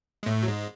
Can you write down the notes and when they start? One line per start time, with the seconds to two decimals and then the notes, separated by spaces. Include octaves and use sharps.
0.23 G#3
0.26 A2 A3
0.42 F#3
0.48 G#2 G#3